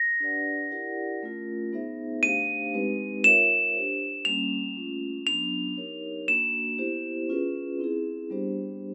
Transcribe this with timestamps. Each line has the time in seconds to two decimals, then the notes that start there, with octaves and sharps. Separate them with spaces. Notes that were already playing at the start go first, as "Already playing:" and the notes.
Already playing: A#6
0.20 D4 G4 B4 D5 F#5
0.71 E4 G4 A#4 D5 F#5
1.23 A3 C#4 F4 A#4
1.73 B3 D#4 G#4 C5 E5
2.23 A3 D4 G4 C5 F5 D#7
2.74 G#3 C4 D#4 G4 B4
3.24 F4 A#4 C#5 E5 E7
3.75 D4 G4 C5
4.25 G3 A#3 C#4 F7
4.76 A3 C#4 F4
5.26 F#3 B3 D4 F7
5.77 D#4 G4 A#4 C#5
6.28 A#3 D4 F#4 E7
6.79 B3 E4 G4 C5
7.29 C#4 F4 G#4 B4
7.79 C4 E4 G#4
8.30 G3 B3 D4 G4 C5